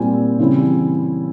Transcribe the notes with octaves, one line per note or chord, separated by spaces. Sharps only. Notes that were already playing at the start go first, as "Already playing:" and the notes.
Already playing: A#2 G3 C4 E4 G#5
C#3 E3 G3 C4 E4